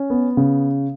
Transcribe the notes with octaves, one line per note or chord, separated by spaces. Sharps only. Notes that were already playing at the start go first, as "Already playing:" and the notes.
Already playing: C#4
B3
C#3